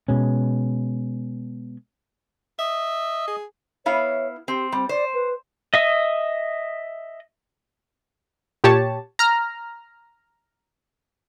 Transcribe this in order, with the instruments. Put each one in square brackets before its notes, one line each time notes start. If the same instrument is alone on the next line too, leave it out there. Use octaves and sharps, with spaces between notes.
[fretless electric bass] B2 G#3 C#4
[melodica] D#5 [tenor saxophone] E5
[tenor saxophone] G#4
[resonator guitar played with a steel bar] B3 E4 F5 [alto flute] C#5
[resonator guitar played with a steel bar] C4 [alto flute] G4
[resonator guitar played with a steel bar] G3 [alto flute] C4
[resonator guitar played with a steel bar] C5 [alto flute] D5
[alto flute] B4
[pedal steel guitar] D#5 E5 D#6
[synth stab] A#2 G4 C#5 A5
A#5 F6